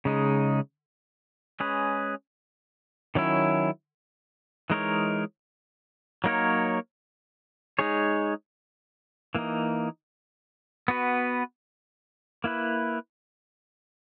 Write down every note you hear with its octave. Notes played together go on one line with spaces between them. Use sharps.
C#3 G#3 D#4
G#3 C#4 G#4 B4
D#3 F#3 C#4 E4
E3 G#3 D#4 A#4 C#5
F#3 A#3 D#4 A#4 C#5
G#3 D#4 G#4 C#5
E3 A#3 D#4
B3 F#4 B4
A#3 E4 B4